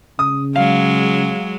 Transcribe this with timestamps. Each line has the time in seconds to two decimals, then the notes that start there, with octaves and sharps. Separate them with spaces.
0.19 C#3 D#6
0.56 F#3 G#3 F5